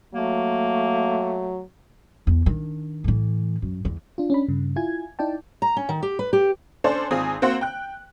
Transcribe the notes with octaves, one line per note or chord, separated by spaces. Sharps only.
F#3 A3 A#3
E2
D#3 D4
A2 E3
F#2
E2
D4 F4
C#4 D4 B5
G2 C#3
E4 F4 G#5 G#6
D#4 E4 D5 G5 A5
A#5
C#4
D#3
G4
B4
G4
C#4 D4 A4 C5 D5
G#1 C4 F4 G#4 G#5 D#6
A#3 C4 F#4 C5 F#5
G5 F#6